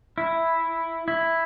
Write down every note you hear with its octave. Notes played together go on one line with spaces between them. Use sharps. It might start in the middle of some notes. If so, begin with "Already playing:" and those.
E4
E4